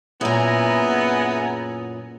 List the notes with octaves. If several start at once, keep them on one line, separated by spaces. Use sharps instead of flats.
F#2 A#2 B3 E4 G#4 G#5 A#5